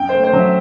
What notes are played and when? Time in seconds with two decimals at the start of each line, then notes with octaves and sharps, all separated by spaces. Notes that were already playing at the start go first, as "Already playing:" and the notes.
Already playing: F#2 G5
0.09 C5
0.14 A3
0.24 C5
0.33 F#3
0.39 E5